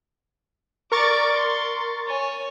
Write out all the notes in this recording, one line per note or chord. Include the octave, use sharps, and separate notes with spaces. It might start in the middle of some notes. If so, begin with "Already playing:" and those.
A#4 D5 C#6 D6 A6
C6
C#5 G#5